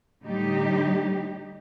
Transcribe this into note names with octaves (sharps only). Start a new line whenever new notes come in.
A2 D3 G3 A3 D#4 G4